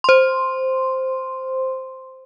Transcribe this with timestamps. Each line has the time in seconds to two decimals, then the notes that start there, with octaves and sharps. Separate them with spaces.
0.04 C5 C6